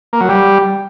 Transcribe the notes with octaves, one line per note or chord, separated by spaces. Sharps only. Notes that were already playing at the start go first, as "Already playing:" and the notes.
A#3
F#3
G3